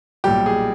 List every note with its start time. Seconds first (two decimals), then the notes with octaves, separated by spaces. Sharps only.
0.24 B1 A#2 G3 G4
0.46 G#4